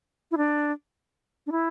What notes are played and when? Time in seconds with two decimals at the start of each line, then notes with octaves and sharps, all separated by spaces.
0.31 E4
0.37 D4
1.46 D4
1.52 E4